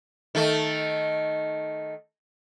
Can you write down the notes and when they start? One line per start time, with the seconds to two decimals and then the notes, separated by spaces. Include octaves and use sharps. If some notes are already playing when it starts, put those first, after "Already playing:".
0.35 D#3 A3